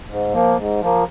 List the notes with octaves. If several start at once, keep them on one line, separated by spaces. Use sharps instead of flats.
G#2
F3 A#3
G#2
F3 A#3